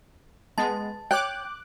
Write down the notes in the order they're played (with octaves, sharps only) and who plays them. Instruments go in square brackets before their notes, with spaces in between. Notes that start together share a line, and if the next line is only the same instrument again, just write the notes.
[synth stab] G#3 B3 [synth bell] A5 A6
[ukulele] C#5 G5 [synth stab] D6 F#6 [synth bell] G6